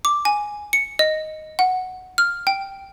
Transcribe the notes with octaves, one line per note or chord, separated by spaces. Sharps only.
D6
G#5
C#7
D#5
F#5
F6
G5